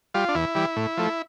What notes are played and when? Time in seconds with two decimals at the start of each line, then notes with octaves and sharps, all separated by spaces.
0.14 G3 F4
0.29 D4
0.35 E2 E4
0.55 E3 G3
0.77 A2
0.97 F3 A3